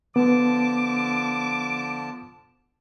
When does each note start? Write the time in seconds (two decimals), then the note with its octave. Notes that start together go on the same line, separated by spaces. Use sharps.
0.16 D3 F3 B3 A5 D6